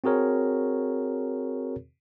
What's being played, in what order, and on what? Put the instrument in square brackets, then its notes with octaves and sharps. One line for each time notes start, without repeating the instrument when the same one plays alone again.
[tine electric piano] C4 F#4 G#4 A#4 C#5